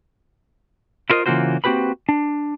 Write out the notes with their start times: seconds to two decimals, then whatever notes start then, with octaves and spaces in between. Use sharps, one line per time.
1.10 E4 F4 A#4 C5 D#5
1.26 C#3 E3 A#3 F4 F#4 C5
1.64 A#3 C4 F#4 G4 B4 B5
2.09 D4